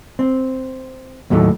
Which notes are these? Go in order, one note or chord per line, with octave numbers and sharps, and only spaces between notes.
C4
D#2 A2 F#3 A3 D#4